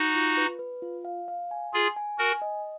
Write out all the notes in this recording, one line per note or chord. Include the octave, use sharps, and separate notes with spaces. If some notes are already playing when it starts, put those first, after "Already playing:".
Already playing: D#4 F#4
F4
B4
B4
F4
F5
F5
G#5
F4 G#4 G#5
G#5
F#4 A#4 G#5
D#5